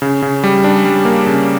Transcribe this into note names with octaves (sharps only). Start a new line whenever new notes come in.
C#3
C#3
G3
D4
G3
A#3
C#3